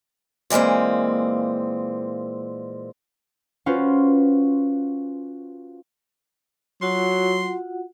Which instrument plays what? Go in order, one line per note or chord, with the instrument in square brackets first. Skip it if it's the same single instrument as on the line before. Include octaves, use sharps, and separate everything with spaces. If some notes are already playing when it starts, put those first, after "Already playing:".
[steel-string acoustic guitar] A#2 E3 G#3 A#3 C4
[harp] C#4 F4 F#4 B4 C5
[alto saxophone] F#3 [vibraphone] F4 F#4 F#5 [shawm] C6